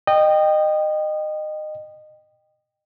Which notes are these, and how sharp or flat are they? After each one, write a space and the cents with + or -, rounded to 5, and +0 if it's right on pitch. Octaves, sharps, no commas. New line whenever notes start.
D#5 -20 G5 +0